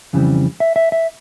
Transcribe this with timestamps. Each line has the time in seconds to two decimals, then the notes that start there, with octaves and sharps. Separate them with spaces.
0.13 F2 C#3 E3 G3 C4
0.60 E5
0.76 E5
0.92 E5